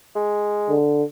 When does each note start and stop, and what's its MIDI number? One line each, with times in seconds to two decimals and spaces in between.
0.15 0.75 56
0.70 1.03 50